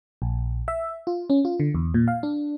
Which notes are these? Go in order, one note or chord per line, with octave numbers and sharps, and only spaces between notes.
A#1
E5
F4
C#4
F4
D3
E2
A#2
F5
D4